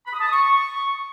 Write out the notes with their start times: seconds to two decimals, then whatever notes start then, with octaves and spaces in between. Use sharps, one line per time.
0.06 B5
0.13 D#6
0.19 A5
0.25 D#6
0.31 C#6